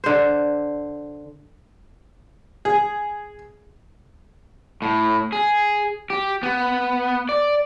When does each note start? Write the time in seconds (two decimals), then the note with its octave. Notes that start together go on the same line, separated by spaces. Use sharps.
0.04 D3 C5
2.65 G#4
4.82 A2
5.32 G#4
6.10 G4
6.43 B3
7.29 D5